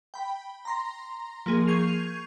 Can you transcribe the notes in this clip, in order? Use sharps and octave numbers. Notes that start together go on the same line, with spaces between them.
G5 B5
A#5 C6 A#6
F3 A#3 G#4 D#7
C#6 G6 G#6 C7 D#7 F7